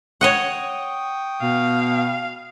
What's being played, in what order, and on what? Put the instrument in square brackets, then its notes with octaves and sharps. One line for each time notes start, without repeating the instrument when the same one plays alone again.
[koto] C#5 D#5 F#5 [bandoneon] G5 C#6 D#6
[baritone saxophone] B2 [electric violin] F5